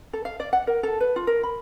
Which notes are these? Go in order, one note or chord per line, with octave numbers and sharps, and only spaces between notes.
A4
F5
D5
F#5
A#4
A4
B4
F4
A#4
B5